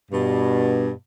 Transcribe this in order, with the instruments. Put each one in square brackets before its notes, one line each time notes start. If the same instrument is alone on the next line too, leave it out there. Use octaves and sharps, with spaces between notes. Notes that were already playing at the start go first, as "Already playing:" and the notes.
[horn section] G2 B2